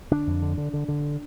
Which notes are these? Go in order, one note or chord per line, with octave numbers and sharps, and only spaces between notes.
D3 D4
F2
D3
D3
D3
D3